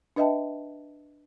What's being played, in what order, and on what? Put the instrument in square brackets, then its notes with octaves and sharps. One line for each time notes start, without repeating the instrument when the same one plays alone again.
[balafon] D4 B4 D#5 E5 G5 A5